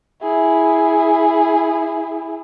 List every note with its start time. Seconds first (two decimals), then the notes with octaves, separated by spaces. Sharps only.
0.23 E4 G#4